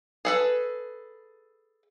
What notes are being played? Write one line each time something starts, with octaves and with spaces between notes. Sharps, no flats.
G#4 A4 B4